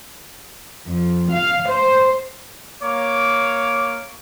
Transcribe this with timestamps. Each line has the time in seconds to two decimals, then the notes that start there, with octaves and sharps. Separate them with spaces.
0.87 F2
1.31 F5
1.68 C5
2.82 A#3 C#5 D6